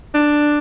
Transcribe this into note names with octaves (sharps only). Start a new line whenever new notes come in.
D4